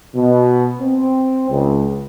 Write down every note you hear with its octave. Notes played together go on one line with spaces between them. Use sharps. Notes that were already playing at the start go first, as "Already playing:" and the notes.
B2
C4
C#2